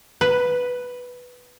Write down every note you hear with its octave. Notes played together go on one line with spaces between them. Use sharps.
B4